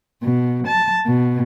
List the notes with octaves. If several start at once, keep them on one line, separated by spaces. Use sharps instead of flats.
B2
A5
B2